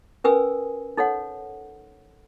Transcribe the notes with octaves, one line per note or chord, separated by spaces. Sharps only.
C#4 A#4 B4 G#5 D#6 E6
D#4 A4 C#5 F#5